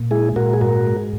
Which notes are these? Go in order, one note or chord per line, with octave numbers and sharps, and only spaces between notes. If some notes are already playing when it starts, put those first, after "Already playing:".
Already playing: A#2
G#3 E4 G#4
A#2 F#4 A#4
G#4
G#2 F#4 A#4
G#3